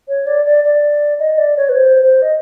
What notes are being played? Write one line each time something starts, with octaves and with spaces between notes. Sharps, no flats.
C#5
D5
D5
D5
D#5
D5
C#5
B4
C5
C5
D#5